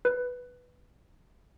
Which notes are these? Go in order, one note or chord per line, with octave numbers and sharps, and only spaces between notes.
B4